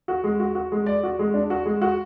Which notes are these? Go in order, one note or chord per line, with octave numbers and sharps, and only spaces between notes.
F#4
G#3
F#4
F#4
G#3
D5
F#4
G#3
D4
F#4
G#3
F#4